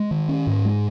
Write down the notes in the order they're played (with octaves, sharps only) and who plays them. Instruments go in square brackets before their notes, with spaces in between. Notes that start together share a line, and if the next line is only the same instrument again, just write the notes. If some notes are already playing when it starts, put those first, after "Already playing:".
Already playing: [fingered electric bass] G#3
D#3
C#4
G#2
G#3